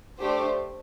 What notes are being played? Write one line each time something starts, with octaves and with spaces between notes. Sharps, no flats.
A3 D4 G4 C5